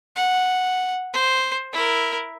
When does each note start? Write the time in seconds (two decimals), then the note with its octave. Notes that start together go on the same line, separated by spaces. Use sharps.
0.16 F#5
1.13 C5
1.73 E4 A#4